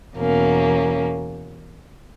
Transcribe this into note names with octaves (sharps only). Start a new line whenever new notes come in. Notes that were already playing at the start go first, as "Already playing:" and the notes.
E2 B2 A#3 C#4